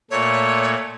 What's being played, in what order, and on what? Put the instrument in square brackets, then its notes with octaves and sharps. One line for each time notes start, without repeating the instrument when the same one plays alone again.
[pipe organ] A#2 A3 [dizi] C#5